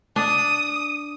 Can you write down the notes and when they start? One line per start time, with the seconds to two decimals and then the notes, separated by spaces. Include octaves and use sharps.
0.16 D4 D#6